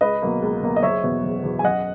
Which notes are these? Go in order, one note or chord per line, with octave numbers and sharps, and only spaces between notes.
C#2 B4 D#5
B2 F#3 A#3
C#2
B2 F#3 A#3
D#5
F#1 C#5 E5
E2 B2
F#1
E2 B2
G#5
F#2 D#5 F#5